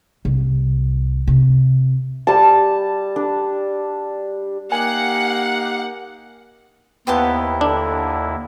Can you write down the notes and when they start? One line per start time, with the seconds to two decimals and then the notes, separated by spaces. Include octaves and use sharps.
0.25 C2
1.27 C3
2.27 G3 A5
3.16 D4 D5
4.72 A#3 D#4 G4 F#5 G#5
7.07 D#2 B3 E4 G4 C5 A5
7.61 D3 D4